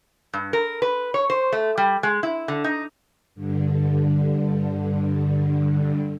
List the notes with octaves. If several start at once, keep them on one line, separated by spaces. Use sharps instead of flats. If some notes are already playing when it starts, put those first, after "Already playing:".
G2
A#4
B4
C#5
C5
A3
G3
G#3
E4
D3
D#4
G2 D3